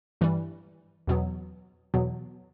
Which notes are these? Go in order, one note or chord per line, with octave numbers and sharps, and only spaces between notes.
G2 E3 G3
E2 B2 F#3 B3
E2 B2 F#3 B3